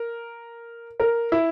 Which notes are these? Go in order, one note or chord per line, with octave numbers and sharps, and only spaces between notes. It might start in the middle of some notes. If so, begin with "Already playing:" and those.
Already playing: A#4
A#4
E4